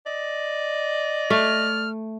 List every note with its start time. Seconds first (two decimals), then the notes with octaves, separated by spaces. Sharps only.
0.06 D5 D#5
1.30 A3 F6